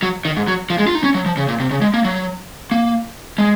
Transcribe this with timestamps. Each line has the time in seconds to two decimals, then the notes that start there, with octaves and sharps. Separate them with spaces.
0.02 F#3
0.25 D#3
0.37 G#2
0.48 F#3
0.70 F3
0.79 G#3
0.87 F4
0.95 D#4
1.04 C#4
1.15 F#3
1.26 F3
1.37 C#3
1.48 A#2
1.60 C3
1.71 C#3
1.81 G#3
1.94 A#3
2.05 F#3
2.71 A#3
3.38 G#3